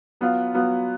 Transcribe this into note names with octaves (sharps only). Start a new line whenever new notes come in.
F#3 B3 F4
F#3 B3 F4